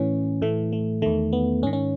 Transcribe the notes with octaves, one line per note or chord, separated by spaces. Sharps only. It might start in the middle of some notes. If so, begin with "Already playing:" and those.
Already playing: A2 E3 C#4
A2 E3 A3
A3
E2 D#3 A3
B3
G#2 D#3 C#4
C#4